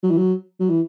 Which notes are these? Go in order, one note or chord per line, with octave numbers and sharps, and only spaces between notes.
F#3
E3
F#3
F#3
E3